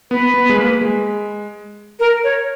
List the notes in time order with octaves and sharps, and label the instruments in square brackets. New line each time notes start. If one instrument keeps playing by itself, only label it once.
[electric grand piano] B3 [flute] B4
[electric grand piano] B3
G#3
A#3
G#3
[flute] A#4
C#5